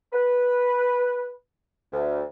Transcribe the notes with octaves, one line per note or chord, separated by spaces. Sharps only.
B4
D2